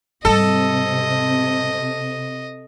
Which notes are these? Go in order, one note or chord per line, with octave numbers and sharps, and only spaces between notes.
G#2 C3 G3 A4 D#5